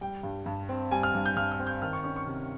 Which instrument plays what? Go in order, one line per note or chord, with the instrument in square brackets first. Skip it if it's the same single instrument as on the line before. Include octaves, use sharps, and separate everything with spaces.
[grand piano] G3 G5
G2
G2
C4
G3 G#5
F6
G2
G6
G2 F6
F6
C4
G6
D#3 F6
C#6
C#4 C#6
C#6
C3